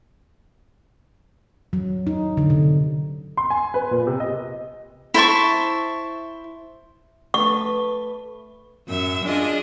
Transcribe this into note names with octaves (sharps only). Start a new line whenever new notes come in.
F#3
D#4
D3
C3
C6
G#5
B4
A#2
C3
D#5
E4 C5 A5 C#6
A3 B4 C#6
F#2 E5
D4 F4 G#4 D#5